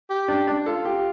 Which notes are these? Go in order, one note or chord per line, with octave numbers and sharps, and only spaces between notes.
G4
D4
D4
F4 A4
G4